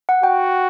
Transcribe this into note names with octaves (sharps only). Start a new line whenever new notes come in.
F#5
F#4 G5